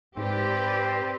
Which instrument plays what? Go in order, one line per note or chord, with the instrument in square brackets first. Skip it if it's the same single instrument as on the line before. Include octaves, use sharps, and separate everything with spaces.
[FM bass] G#2 [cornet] C4 [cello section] G4 B4 D5